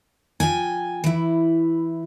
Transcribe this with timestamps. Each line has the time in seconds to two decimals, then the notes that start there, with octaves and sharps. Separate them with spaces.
0.40 F3 G5 G#5
1.04 E3 E4